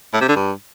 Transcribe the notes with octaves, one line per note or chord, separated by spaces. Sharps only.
A2
C3
D3
G2